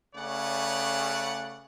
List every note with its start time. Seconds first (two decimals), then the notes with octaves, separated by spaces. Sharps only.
0.15 C#3 A3 B4 C#5 D5 F#5